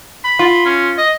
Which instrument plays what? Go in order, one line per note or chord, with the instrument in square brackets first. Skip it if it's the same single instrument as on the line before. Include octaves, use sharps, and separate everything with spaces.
[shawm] B5
[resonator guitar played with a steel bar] F4
[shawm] C#4
D#5